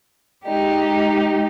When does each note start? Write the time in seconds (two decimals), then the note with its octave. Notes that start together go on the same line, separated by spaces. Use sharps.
0.45 G#3 D#4 G4